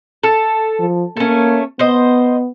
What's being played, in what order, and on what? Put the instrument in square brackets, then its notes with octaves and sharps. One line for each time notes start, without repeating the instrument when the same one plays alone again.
[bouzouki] A4
[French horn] F3
[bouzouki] A3 C#4 [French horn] A#3
[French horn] B3 [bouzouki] C5 D#5